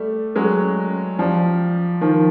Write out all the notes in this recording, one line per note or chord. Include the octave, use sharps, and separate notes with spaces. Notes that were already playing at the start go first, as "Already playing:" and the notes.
Already playing: G3 A3
F#3 G#3
F3 G3
D#3 F3